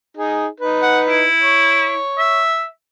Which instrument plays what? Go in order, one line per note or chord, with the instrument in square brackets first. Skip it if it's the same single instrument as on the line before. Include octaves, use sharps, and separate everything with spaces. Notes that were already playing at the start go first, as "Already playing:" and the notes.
[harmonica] D#4 G#4
D#4 B4
[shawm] F#5
E4
[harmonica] C#5
[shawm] E5